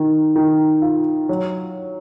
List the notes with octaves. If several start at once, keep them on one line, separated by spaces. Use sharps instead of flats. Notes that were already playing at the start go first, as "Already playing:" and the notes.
Already playing: D#3
D#3
F4
F#3